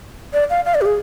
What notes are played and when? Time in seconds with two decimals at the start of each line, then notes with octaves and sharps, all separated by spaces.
0.33 D5
0.50 F5
0.65 F5
0.75 D5
0.81 G4
0.85 G#4